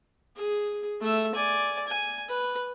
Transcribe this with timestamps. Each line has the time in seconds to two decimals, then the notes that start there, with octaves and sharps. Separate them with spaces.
0.36 G#4
1.01 A3 E5
1.35 D5 G#5
1.87 G#5
2.29 B4